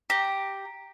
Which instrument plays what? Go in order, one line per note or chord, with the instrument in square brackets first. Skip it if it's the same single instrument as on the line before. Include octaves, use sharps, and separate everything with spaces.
[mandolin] G4 A#5